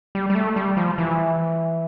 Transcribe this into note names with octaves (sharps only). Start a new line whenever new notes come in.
G3
G3
A3
G3
F3
E3